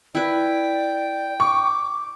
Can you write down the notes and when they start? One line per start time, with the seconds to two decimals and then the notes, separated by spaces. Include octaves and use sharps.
0.15 E4 B4 D5 G5
1.40 C#6 D6